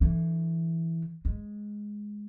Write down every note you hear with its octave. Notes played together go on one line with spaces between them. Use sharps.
D3 E3
G#3